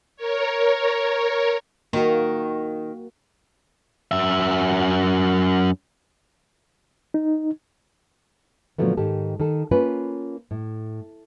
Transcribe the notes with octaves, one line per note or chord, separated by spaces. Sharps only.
A#4 C#5
D#3 A#3 F#4
F#2 E5
D#4
A#2 D3 F3 F#3 A3 B3
G#2 D#3 G4 A4
D#3 A4
A#3 C#4 F4 B4
A2